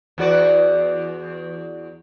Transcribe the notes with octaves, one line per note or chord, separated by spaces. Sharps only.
E2 F#4 D5